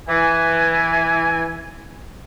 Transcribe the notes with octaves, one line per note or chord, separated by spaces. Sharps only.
E3 G#5